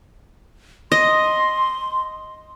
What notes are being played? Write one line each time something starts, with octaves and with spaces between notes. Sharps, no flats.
D#5 C6